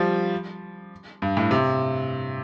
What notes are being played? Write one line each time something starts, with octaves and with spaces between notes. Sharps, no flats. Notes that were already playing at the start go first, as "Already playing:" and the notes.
Already playing: F3 G3
G2
A2
C3